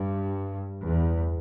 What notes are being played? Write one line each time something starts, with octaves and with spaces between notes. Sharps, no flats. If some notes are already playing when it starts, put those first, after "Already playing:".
Already playing: G2
E2